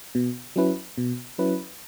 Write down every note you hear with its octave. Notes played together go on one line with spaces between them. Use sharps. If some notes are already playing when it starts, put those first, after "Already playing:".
B2
F#3 C#4 E4 B4
B2
F#3 C#4 E4 B4